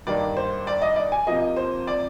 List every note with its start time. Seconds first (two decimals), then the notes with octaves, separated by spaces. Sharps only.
0.07 G2 D#3 A#3 D5
0.37 C5
0.67 D5
0.82 D#5
0.96 D5
1.12 G#5
1.27 C3 F3 A#3 D#5
1.57 C5
1.87 D5